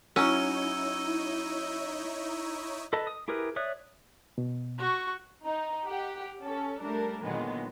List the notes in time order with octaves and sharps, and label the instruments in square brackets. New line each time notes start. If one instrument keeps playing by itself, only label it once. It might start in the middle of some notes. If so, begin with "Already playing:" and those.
[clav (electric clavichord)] F#3 [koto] C#4 [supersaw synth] D#4 E4 C#5 [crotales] E6 D#7
[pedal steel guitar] A4 B4 D#5 A5
D#6
E4 G4 G#4 A#4 B4
C#5 D5 E5 D#6 F#6
[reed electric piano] B2
[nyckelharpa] F#4 C#6
[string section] D#4
G4 F#5
C#4 A4
G3 A3 D4 A#4
A#2 D3 D#3 F#3 G#3 B3